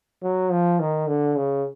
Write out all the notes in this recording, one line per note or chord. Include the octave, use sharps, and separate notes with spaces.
F#3
F3
D#3
D3
C#3